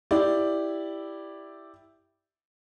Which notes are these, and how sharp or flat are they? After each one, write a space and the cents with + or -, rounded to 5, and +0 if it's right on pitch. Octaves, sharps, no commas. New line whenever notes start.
E4 +0 G4 +0 D5 +0